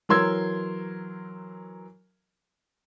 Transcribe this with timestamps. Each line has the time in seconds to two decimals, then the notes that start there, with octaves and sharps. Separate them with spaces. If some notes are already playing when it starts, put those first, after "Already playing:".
0.09 E3 F#3 A#4 C6 E6 G#6